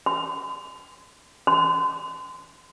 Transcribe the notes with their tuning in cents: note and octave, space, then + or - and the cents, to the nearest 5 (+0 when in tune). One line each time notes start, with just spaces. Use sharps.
C6 -45
C6 -35